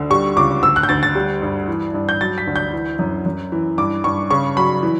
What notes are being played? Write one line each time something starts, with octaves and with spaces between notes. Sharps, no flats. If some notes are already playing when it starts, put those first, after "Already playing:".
Already playing: D2 D3
G3 C#6
C#2 D6
D2 E6
F#6
G6
D2 A6
A6
G3
G2
E3
G2
G6
F#3 A6
B6
D2
G6
E3
F#2
F#2
E3
G2 D6
G2 C#6
C#3 C#6
F#3 B5
E3